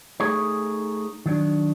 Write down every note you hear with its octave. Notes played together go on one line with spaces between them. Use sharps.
A3 D#4 G#4 A#4 C#5
D#3 F#3 D4